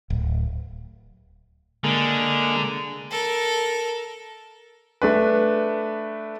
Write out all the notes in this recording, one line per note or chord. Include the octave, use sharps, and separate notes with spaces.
D1
D3 G#3 A#3
A4 A#4
A3 D4 B4